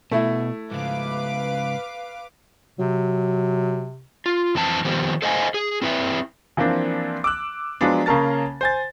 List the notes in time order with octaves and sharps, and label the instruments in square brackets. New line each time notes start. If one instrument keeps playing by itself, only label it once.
[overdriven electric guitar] B2 [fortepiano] A3 E4
[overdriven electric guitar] G#2 C#3 [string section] B4 F5 D6
[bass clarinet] C3 [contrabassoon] F#3
[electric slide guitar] F4
F2 E3 C4 A5
D#3 F3 B3 G4 C5
A4 C5 D#5 F5 G#5
G#4
C4 E4 B4 E5
[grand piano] E3 F3 A#3 C4 D4
D6 E6 F#6
F3 F#3 G#3 B3 D4
C#3 A#3 C#4 A#4 A5 A6
C5 G#5 A6